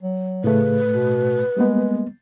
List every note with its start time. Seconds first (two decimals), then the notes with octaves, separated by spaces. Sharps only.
0.02 F#3
0.44 A2 C#3 A3 B4
0.91 B2
1.57 G3 G#3 A#3 B3